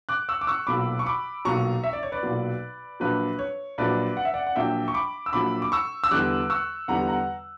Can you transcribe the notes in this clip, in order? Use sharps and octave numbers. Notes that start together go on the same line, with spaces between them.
D6 F#6
C#6 E6
D6
C#6 E6
B1 A#2 F#3 B5 D6
C#6
B5 D6
B1 A#2 F#3 A#5 C#6
E5
D5
C#5
B4 D5
B1 A#2 F#3
A#1 A#2 F#3 B4
C#5
A#1 A#2 F#3 B4 D5
F#5
E5
D5 F#5
F#5
A#1 A#2 F#3 E5 G5
C#6
B5 D6
E6
A#1 A#2 F#3 B5 D6
D6
C#6 E6
E6
E2 D3 G3 D6 F#6
C#6 E6
E2 D3 G3 F#5 A#5
F#5 A#5